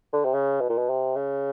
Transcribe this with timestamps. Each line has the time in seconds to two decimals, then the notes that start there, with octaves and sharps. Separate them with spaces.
0.13 D3
0.25 C3
0.34 C#3
0.61 B2
0.69 A#2
0.78 B2
0.90 C3
1.16 C#3